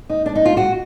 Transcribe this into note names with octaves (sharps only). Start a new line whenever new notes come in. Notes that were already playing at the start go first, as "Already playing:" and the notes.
D#4
D4
D#4
F4
F#4